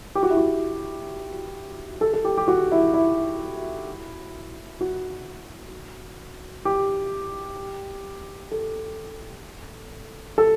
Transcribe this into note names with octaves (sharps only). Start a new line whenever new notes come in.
G4
F#4
E4
F#4
A4
A4
G4
G4
F#4
E4
E4
F#4
G4
A4
A4